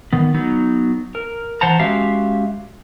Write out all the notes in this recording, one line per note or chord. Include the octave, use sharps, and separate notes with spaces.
D#3 B3
F#3 B3 D#4
A#4
E3 C5 F#5 A5 A#5
G#3 C#4 F#4 G4 E5 F5